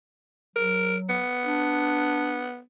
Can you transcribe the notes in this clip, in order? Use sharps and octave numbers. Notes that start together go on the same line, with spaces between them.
F#3 A#4
B3
D4